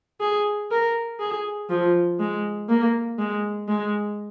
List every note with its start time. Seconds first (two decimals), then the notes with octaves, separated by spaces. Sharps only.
0.20 G#4
0.71 A#4
1.20 G#4
1.69 F3
2.19 G#3
2.69 A#3
3.18 G#3
3.68 G#3